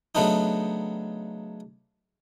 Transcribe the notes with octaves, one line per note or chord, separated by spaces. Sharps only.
C#3 F#3 A3 B3 D4 D#4